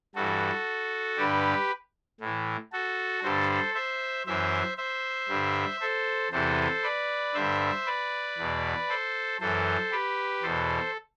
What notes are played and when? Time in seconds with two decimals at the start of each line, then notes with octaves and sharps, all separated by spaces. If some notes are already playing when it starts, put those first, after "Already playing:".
0.15 G2 E3 F#4 A4
1.17 G2 D3 G4 B4
2.20 A2 E3
2.72 F#4 A4
3.23 G2 D3 A4 C5
3.75 C5 E5
4.27 F#2 E3 C5 E5
4.77 C5 E5
5.29 G2 D3
5.80 A4 C5
6.31 E2 C3 E3 A4 C5
6.83 B4 D5
7.34 G2 D3 C5 E5
7.86 B4 D5
8.38 E2 B2
8.89 A4 C5
9.41 F#2 E3 A4 C5
9.92 G4 B4
10.43 E2 B2 A4 C5